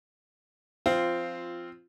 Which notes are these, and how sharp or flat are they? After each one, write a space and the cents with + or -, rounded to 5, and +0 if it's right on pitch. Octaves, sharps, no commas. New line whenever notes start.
F3 +0 C4 -5 F4 -10